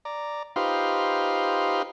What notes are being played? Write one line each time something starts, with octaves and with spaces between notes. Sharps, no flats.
D5 A#5
D#4 F4 G4 B4 C5 F5